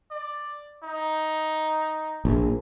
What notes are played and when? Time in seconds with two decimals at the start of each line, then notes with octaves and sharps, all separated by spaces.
0.11 D5
0.84 D#4
2.25 A#1